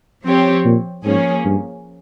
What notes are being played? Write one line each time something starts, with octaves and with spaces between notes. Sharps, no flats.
F3 C4 G4 C#5
A#2
G#2 F3 A#3 C#4 G#4
G2